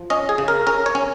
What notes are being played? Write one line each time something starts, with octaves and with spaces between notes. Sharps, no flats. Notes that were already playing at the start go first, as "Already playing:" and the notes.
Already playing: F3
C#4 D#5
G#4
C#3
A#4
C#4 A#4
C#5
C#4